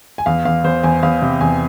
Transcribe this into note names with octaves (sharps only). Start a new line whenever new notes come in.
G#5
E2 F5
E2 F5
E2 C5
E2 G#5
E2 F5
C3
E2 G#5